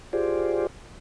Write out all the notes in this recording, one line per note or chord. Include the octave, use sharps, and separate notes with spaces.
F4 G4 G#4 C5 D5